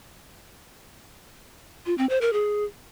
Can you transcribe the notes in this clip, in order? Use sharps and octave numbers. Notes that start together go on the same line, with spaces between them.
F4
C4
C5
A#4
G#4